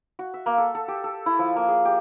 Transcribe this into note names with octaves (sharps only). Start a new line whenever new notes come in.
F#4
E5
A#3
A4
A4
G4
A4
E4
F3
A#3
G#4
G4